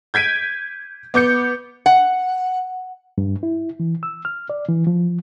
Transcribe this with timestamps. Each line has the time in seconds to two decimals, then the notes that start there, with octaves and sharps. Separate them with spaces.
0.14 G6 G#6 B6 D7 D#7
1.14 B3 D6 G6 C#7
1.86 F#5
3.18 G2
3.43 E4
3.80 E3
4.03 E6
4.25 F6
4.50 D5
4.68 E3
4.87 F3